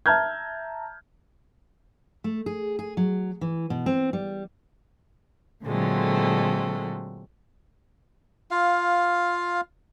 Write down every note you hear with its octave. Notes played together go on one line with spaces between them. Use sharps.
E5 A5 A#5 F6 G6 G#6
A3
G#4
G#4
F#3
E3
B2
C4
G3
A#2 D3 F#3 G#3 A3 C4
F4 F5